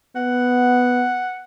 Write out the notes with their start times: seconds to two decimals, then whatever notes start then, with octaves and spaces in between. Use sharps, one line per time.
0.16 B3 F#5